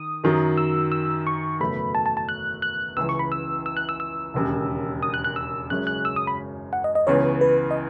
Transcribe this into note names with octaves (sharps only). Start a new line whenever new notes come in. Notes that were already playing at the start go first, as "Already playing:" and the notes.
Already playing: D#3 D#6
F#2 D#3 F#3
E6
E6
C#6
F#1 E2 B2 A3 B5
A5
A5
A5
F#6
F#6
C#2 C#3 E3 E6
C#6
B5
E6
E6
F#6
E6
E6
E1 D#2 C#3
D#6
F#6
F#6
E6
F#1 F#2 C#3 G#3 C#4 F#6
F#6
E6
D#6
B5
F#5
D#5
D#5
C#2 C#3 E3 B3 C#5
B4
D#5